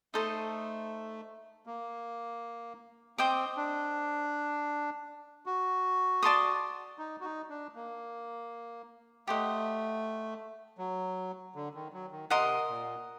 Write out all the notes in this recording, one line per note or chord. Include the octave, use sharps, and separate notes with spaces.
A3 D#4 A4 C5 D#5
A#3
C4 C5 D#5 G5 D6
D4
F#4
D5 A5 C6 D#6
D#4
F#4
D#4
D4
A#3
A3 G4 C5 D#5 F#5
F#3
D3
D#3
F#3
D#3
C3 A#4 D#5 F#5 C6
A#2